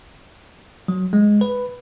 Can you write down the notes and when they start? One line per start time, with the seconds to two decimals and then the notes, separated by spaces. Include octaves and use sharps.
0.88 F#3
1.13 G#3
1.41 B4